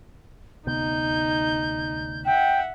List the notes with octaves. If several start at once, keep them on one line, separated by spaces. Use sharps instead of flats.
D2 C3 B3 D#4 G6
E5 F#5 G5